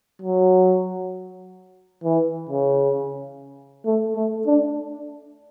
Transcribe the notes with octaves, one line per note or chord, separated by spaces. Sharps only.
F#3
E3
C#3
A3
A3
D4